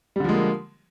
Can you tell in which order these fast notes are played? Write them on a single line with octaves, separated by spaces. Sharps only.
G3 D3 F3 G#3 A#3